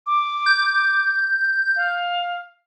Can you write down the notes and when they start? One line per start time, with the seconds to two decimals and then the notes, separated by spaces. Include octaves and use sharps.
0.07 D6
0.46 G6
1.76 F5